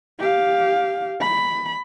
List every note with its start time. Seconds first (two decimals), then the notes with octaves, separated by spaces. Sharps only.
0.19 G4 F5
1.21 B5